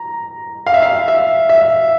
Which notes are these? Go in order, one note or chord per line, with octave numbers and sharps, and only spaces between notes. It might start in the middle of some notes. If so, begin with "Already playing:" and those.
Already playing: A#5
F5
E5
F5
E5
E5